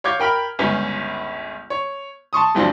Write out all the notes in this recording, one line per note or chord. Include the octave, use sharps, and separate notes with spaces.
C#5 F5 C#6 D6 G6 G#6
A#4 G5 B5 F6
G1 C#2 C#4 B4 G6
C#5
A5 C6 C#6 D#6
D2 G2 F3 F#3 C4 D4